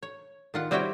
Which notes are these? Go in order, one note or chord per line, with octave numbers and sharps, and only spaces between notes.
C#5
D#3 F4 F#5
G3 C4 E4 F#4 C#5 G5